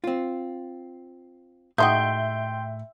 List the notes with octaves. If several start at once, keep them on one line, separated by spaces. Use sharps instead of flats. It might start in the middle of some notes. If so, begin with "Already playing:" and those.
C4 F4
A2 G#3 D#4 F#4 E5 G5 C6 G6